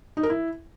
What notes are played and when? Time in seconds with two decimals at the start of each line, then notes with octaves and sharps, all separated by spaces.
0.17 D#4
0.23 A#4
0.30 E4